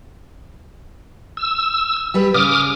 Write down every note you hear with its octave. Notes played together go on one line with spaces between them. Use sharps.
E6
G3 G4 B4
C#3 D6 D#6 F6